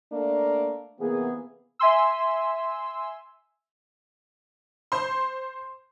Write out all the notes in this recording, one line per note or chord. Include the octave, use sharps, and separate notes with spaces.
A3 A#3 D4
C3 E3 A#3 B3 G#4
E5 G#5 C6 E6
C5 C6